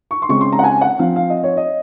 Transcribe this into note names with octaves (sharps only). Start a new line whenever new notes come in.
C#6
C6
C#3 G#3 C4 C#6
C6
A#5
F#5
G#5
F#5
F3 C4 F5
F5
D#5
C#5
D#5